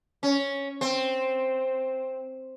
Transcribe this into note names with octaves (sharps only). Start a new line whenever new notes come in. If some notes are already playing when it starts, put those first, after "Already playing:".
C#4
C4